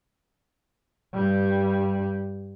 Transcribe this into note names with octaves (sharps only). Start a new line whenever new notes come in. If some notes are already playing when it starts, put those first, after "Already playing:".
G2 G3